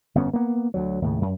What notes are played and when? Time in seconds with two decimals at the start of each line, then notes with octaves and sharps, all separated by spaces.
0.15 G1 F2 B3 C#4
0.33 A#3 B3
0.74 D2 F#3
1.02 D#2 A2 C#3
1.22 F#2